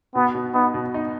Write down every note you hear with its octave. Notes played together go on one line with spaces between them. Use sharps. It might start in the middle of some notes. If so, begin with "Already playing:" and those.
B2 B3
B2
B3 D#4
B2
D#4